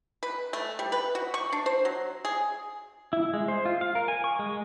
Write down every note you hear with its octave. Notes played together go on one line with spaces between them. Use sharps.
B4
A3
G3
B4
F#4
C#6
D4
C5
F#3
G#4
E4
G#3
C5
F4
F5
A#4
G#5
C#6
G#3